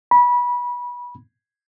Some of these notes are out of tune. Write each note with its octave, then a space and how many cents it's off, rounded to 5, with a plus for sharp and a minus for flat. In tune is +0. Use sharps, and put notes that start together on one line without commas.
B5 -25